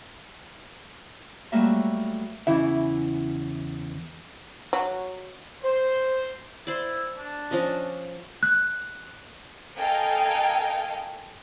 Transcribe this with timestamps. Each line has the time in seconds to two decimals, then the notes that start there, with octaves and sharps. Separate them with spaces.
1.52 F#3 G3 A3 A#3 E5
2.47 E2 C#3 E3 E4 E5
4.73 F#3
5.63 C5
6.67 E4 C5 D5
7.17 D4
7.51 F3 C#4 D#5
8.43 F#6
9.78 A4 A#4 D#5 F5 G5 G#5